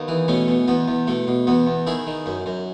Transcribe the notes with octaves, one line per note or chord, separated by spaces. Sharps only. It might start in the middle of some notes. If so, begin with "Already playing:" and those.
Already playing: D#2 B3 D#4
E3
B2 A3 C#4
B2
E2 B3
E2
B2 A3
B2
E2 B3
E2
D#3 E4 G#4
D#3
F#2
F#2